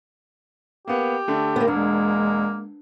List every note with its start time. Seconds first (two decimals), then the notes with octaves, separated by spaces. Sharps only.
0.88 A#3 B3 G4
1.28 D3 A3
1.56 A#3 B3
1.68 E1 G#3 A#3 D4